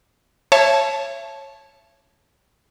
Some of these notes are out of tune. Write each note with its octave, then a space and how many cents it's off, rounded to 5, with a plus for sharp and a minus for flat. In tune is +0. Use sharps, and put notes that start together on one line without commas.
C#5 -15 E5 +30 A5 -15